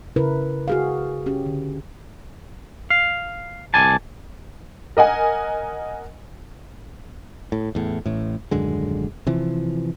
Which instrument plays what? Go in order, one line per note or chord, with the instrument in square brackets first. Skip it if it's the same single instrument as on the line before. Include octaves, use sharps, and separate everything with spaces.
[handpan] C#3 E4 A#4 B4
F#4 G#4 F5
C#4 G4
D3
[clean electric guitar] F5
C2 D5 G#5 A5
[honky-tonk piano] A#4 D#5 F#5 G#5
[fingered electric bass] A2
E2 A2
A1 A2
D#1 F#2 D3 G#3
C3 E3 F3